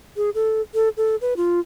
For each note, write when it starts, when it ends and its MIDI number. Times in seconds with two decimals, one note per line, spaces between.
0.17 0.30 68
0.35 0.61 69
0.74 0.89 69
0.97 1.16 69
1.21 1.34 71
1.37 1.60 65